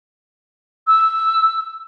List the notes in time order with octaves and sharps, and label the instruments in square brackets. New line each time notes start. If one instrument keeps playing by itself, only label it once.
[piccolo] E6